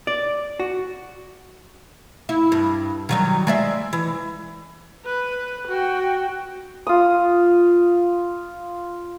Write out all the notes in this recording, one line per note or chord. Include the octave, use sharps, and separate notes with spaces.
D5
F#4
E4
G2
D#3 F#3 G3
G#3 D5 E5
E3
B4
F#4 G5
F4 D#6